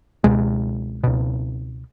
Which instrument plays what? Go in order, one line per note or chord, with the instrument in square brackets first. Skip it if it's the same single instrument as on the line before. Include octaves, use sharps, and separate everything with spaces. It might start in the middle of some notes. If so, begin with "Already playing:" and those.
[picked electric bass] C#2 B2 G#3
C#2 B2